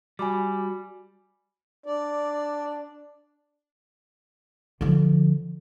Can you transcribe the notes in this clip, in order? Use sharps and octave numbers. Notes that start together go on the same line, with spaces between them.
G3 F#4 G#5 B5 D6
D4 D5
D3 F3